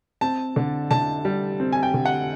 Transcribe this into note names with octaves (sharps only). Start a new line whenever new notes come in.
C4 A5
D3
D3 A5
G3
C4
G#5
G5
D3
F#5